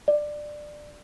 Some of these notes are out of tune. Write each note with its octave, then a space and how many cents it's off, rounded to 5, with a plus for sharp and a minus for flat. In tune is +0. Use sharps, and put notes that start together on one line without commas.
D5 +15